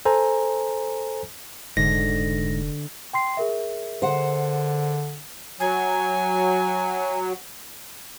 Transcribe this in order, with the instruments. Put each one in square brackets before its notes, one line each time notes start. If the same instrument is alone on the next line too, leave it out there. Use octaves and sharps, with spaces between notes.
[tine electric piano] A4 C5 G#5 A#5
[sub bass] F1 [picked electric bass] G#2 [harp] D3 [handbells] A#6
[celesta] G5 C6 C7
G#4 A#4 E5
[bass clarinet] D3 [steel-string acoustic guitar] C5 F#5
[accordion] F#3 [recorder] G#5